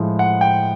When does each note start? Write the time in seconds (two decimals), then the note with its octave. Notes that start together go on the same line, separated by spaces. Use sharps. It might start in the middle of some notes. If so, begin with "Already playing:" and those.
Already playing: A2 F3 G#3
0.19 F#5
0.41 G5